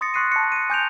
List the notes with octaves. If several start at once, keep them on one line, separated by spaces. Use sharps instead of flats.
C6 D#6 A6 A#6 C#7
C6 C#6 F#6 C7 C#7 D#7
A5 C#7
C#7 D#7
G#5 D6 G6 C#7 D7 F7